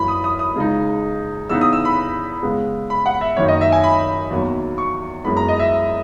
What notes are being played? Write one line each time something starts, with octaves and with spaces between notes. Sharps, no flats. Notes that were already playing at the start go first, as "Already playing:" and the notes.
Already playing: F#2 E3 A#3 C#4 E4 B5
D#6
D#6
D#6
C#2 C#3 G#3 D#4
C#3 E3 B3 D#4 E6
D#6
E6
B5
C#3 G#3 B3
B5
F#5
E5
F#2 D#3 A#3 D#4 C#5
D#5
E5
G#5
B5
E2 D#3 F#3 A#3
C#6
F#2 E3 G#3 B3 B5
A#5
D#5
E5